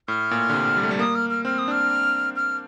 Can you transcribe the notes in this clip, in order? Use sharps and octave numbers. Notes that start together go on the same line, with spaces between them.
A2 F6
A#2
D3
C3
G3
A3
G3
A#3 D#6
F6
F6
C4 F6
D#6
D4 F6
F6